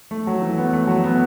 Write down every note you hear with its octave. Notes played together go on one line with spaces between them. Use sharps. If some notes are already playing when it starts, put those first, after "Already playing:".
A3
F#3
E3
B3
A3
F#3
B3